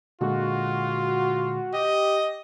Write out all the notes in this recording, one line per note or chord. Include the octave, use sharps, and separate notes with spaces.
A#2 D3 G#3 F4 F#4
G4 D#5